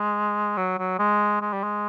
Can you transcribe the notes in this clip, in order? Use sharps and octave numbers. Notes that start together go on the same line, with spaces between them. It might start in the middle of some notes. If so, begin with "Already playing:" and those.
Already playing: G#3
F#3
F#3
G#3
G#3
G3
G#3